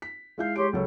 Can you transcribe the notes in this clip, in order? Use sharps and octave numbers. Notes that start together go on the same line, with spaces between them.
B6
G#3 E4 F5 G6
G#3 G4 C#5 C6 D6 D7
C#2 F#3 A4 C#5